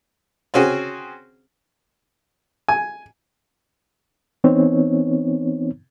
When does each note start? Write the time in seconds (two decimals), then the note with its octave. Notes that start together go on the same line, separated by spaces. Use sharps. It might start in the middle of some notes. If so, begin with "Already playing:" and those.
0.54 C4 C#4 F#4 G#4
2.68 G#5
4.44 E3 B3 C4 D#4 C#5